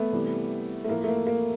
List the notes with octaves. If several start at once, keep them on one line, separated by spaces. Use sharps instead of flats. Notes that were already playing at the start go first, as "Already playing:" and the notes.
Already playing: A3 B3
C3 E3 G3
A3
A2 F3 A#3
A3
A#3
A#3